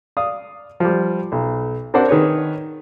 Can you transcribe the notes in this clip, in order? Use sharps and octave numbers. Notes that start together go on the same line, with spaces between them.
D5 F5 D#6
F3 G3
B1
C4 D4 A#4 C5 D5 F#5
D#3 G#4 B4 C#5